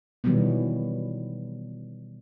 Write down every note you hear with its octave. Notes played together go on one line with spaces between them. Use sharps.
B2 D#3 E3 F#3 G3 B3